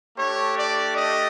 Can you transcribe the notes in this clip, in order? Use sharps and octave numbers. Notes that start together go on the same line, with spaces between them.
A3 D4 G4 C#5
D5
D#5